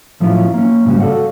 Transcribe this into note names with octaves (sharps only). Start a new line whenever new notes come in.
A2 F3 F#3 C#4 E4 F4
A#3 C#4
G#2 C#3 G3 C#4 F#4
F#4 A4 A#4 D5 F5 F#5